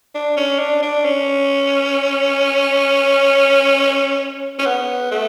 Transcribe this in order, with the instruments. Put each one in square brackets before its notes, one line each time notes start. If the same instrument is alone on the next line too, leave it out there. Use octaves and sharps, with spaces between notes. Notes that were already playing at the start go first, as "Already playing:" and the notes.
[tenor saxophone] D4
C#4
D4
D4
C#4
C#4
B3
A3